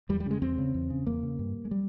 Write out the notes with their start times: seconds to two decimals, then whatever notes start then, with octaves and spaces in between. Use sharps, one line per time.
0.09 E2 G3
0.20 G3
0.26 C#3 G#3
0.42 E2 C4
0.58 C#3
0.74 E2
0.90 C#3
1.07 E2 A#3
1.23 C#3
1.39 G2
1.65 G#3
1.71 G3